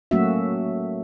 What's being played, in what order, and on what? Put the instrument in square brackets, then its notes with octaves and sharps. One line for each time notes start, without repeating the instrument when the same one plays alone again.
[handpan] F#3 A3 A#3 C#4 F#4 E5